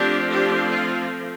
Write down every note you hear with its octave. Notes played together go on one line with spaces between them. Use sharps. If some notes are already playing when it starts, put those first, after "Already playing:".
Already playing: F3 A3 C4 D4 G4
D4 G4
F4